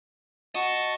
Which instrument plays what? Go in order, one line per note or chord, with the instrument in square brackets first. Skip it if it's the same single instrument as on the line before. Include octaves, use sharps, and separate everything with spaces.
[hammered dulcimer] F#4 [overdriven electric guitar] D#5 [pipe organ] A5 C#6